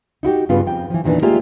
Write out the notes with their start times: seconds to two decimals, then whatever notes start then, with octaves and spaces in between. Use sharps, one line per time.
0.23 D#4 E4 F#4 G4
0.49 G2 C#3 G3 B3 F4
0.67 F2 G5
0.90 E3 F3
1.04 E2 A#2 D#3 E3 B3 D4
1.22 G#3 A#3 F4 G4 D5 E5